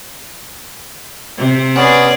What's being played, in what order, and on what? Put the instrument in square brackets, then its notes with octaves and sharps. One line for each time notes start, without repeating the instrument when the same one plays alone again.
[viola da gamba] C3
[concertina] B3 C#4 [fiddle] G#4 D5